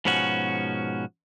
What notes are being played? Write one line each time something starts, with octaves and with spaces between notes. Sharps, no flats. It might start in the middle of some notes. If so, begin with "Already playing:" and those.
G#2 B2 F3 C#4 F#4